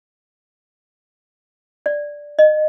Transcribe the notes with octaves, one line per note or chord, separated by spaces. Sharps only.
D5
D#5